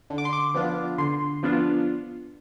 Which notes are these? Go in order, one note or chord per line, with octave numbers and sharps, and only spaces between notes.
D3
D6
C6
D6
F3 B3 D4 F4
D3 C6
F3 B3 D4 F4